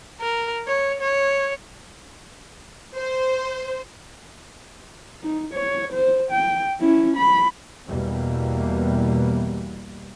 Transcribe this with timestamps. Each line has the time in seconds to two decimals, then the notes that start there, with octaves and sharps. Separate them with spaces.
0.20 A#4
0.67 C#5
1.01 C#5
2.94 C5
5.23 D#4
5.53 C#5
5.92 C5
6.31 G5
6.80 C#4 E4
7.16 B5
7.87 E2 B2 E3 G3 A#3